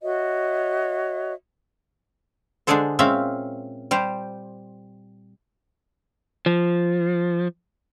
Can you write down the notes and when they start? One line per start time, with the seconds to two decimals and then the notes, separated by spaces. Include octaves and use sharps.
0.02 F#4 C#5 D#5 E5
2.67 D3 G#3 D4 G#4 A4 C5
2.99 A#2 G#3 C4 C#4 E5 F5
3.91 G3 G4 C5
6.46 F3